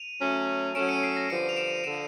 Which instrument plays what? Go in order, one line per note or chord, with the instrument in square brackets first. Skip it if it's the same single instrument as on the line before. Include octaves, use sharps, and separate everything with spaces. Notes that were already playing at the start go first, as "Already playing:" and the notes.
Already playing: [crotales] D#7 F7
[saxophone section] F#3 A3 C#4
[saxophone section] F#3 A3 C#4 [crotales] D7 E7
[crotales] C#7 D#7
C7 D7
A#6
[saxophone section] G2 D3 F3 [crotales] C#7 D#7
[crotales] F7
D7 E7
[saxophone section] D3 F3 [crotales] D7 E7